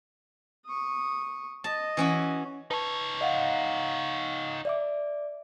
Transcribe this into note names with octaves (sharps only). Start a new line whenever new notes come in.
C#6 D#6
D#5 A5
E3 C#4 F#4
D#4 B4 C#5 A5
D#5 F5 F#5
D5 E5 D6